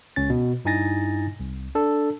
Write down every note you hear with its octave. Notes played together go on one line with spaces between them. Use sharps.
C#2 C#4 A6
B2
G2 D#4 E4 G#5 A6 A#6
C2
D4 A4